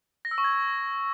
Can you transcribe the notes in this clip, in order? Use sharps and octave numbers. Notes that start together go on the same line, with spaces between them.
A#6
E6
C#6
G#6